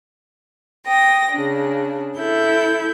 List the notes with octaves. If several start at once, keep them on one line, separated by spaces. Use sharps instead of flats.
G5 D#6 A#6
C#3 D4
E4 A4 E5 G6